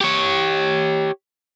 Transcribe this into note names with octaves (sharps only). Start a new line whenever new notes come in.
G4 C#5